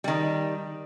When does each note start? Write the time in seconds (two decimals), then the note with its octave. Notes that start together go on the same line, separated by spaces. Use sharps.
0.04 D#3 G3